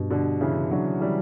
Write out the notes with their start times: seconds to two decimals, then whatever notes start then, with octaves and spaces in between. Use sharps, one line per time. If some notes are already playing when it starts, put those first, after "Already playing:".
Already playing: G2 B2
0.10 B2 D3
0.41 C#3 E3
0.71 D3 F#3
1.00 E3 G3